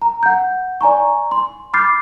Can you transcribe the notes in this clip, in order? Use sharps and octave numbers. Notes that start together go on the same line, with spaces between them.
A#5
F#5 G6
D5 G#5 A#5 C#6
C6
B5 D6 F6 G6 A6 C7